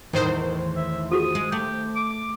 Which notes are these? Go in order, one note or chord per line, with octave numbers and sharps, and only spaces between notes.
E2 A2 D#3 E3 C5
E5
F4 F#4 G#4 D#6
G#3
A3 G4
D6